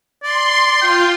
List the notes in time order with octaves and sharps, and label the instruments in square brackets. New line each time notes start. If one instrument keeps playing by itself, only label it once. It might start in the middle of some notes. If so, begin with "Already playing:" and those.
[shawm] D5 [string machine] C6
[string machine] F4 [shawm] G5